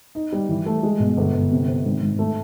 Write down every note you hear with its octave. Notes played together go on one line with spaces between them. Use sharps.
D#4
G3
E3
A3
G#3
B2
G1
G1
C3
C4
G#1
G#1
A3